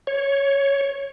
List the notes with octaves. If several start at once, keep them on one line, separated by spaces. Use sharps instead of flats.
C#5